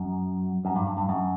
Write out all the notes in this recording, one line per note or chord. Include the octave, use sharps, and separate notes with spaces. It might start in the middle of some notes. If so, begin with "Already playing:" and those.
Already playing: F#2
F#2
G2
G2
G2
F#2